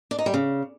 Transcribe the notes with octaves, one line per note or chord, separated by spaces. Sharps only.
D4
D#4
G3
C#3